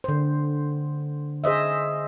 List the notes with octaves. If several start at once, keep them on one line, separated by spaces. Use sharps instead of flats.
D3 C5
G#4 C5 D#5 E5